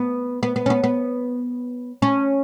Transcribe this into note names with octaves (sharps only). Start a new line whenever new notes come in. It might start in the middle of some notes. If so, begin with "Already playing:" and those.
Already playing: B3
B3
B3
C#4
B3
B3
C#4